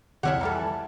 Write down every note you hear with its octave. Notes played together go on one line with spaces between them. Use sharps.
C2 F2 F3 E4 G4 C#5 F#5
E3 G3 A4 A#5 F6
G#5 A5